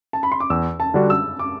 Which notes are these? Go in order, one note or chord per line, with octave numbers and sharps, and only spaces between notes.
A5
B5
C6
D6
E2 E6
A5
D3 G3 D4 F#4
E6
D6